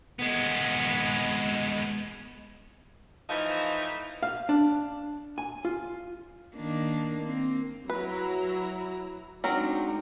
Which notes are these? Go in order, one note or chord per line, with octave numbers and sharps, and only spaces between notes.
G#3 B3
E3 F3 A3 D#4
F5
D4
G#5
F4
D#3 A#3 D4
A#3 C4
F#3 E4 B4 A#5
F#3 G#3 C4 D4 D#4 A#4